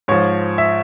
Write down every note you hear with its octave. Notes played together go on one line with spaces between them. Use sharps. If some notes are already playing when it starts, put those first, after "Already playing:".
G#2 F3 C#5
E5